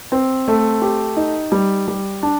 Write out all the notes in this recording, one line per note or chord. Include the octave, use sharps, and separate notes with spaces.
C4
A3
G4
D#4
G3
G3
D4